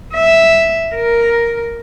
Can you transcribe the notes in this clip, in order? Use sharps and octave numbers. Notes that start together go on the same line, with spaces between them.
E5
A#4